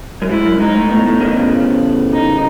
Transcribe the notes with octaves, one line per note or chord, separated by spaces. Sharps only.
F#2
G#2 E4
F#2
G#2 D#4
A2
A2 B3
A2
B2 D#3
A2 C#3
D#4